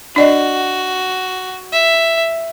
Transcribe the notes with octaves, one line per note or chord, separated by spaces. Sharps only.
D4 F#4 D5 D#5
E5